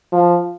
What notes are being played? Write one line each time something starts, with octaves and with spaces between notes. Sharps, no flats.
F3